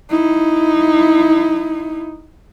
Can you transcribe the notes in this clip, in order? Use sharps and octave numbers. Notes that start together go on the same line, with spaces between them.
D#4 E4